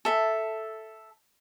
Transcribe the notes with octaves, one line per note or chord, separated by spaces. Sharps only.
A4 E5